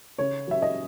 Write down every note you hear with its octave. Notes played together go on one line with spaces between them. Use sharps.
C#3 C#5
F#3 E5
D#5